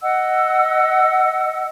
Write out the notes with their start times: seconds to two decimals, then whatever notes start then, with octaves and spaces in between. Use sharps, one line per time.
0.01 D#5 F#5 E6